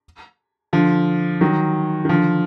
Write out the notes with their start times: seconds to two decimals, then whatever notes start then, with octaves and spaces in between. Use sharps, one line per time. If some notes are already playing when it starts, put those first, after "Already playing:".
0.73 D3 F3
1.41 D#3 F#3
2.05 D#3
2.09 D3 F3